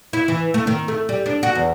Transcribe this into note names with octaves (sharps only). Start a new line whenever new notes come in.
E4
E3
A3
D#3
A3
G3
D4
F#4
E2